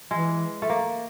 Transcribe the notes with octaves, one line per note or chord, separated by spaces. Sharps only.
E3 G#3
A3
A#3